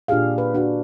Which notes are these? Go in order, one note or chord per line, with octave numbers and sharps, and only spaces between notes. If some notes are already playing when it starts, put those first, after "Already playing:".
A#2 D4 F4 G4 G#4 F5
B4
D4 F#4 B4